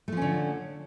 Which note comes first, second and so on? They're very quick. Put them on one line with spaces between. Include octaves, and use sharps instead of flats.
A3 F3 C#4 D3